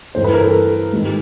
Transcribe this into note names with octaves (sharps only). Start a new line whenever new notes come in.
G2 E3 A3 C5
B4
A#4
A4
G#2 D#3 G3